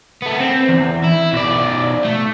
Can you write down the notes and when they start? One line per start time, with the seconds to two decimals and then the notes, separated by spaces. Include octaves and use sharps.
0.22 A3 B3
0.40 C4
0.69 E2
1.04 E4
1.33 B1 D5
2.05 A3